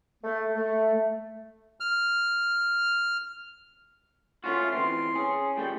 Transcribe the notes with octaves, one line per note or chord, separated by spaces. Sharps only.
A3
A3
F6
A3 C#4 F4 F#4
E3 C4 F4 C6
C#4 G#4
A2 F3 G3 G5